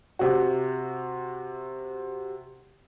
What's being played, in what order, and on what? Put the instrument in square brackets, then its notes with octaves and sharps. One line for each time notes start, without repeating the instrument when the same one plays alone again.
[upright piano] C3 F#4